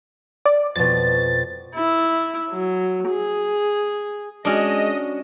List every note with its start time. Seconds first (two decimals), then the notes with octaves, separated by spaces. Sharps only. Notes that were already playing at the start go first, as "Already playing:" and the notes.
0.46 D5
0.76 F2 B2 A6
1.76 E4
2.51 F#3
3.10 G#4
4.45 G#3 C#4 D4 F#4 D#5